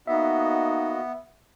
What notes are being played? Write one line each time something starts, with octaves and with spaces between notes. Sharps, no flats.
A#3 B3 D#4 F#4 D#5 E5